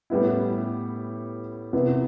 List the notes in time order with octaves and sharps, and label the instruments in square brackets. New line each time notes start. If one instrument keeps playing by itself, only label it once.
[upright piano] A2 G3 B3 E4
C3 E3 B3 E4